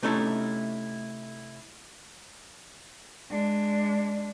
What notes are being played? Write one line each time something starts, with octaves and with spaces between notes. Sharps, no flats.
C3 A3 C#4 D#4 E4 A4
G#3 D4